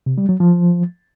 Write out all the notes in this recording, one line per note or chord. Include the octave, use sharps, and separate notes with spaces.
C3
G3
F#3
F3